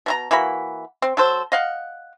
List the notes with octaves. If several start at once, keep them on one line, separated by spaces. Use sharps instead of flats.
B2 E4 A#5
E3 A#3 F#4 B5
C4
F#3 A4 C5
D#5 F5 F#5